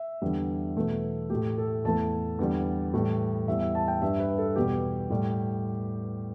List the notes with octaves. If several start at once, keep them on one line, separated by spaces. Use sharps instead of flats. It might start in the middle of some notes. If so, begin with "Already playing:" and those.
Already playing: E5
E2 D3 G3
E2 B2 A3
A2 A3 G4
A4
E2 E3 A3 A5
E2 D3 G3
A2 E3 G3
E2 E3 G3 E5
E5
A5
G5
G2 G3 E5
B4
A4
E2 B2 G3 G4
A2 G3